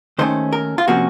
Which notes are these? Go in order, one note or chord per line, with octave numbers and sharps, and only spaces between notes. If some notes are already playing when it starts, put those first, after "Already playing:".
D#2 D#3 A3 C#4 C5
A#4
F4
C3 F3 A#3 C#4 F#4